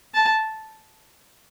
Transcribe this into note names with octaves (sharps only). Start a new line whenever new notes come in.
A5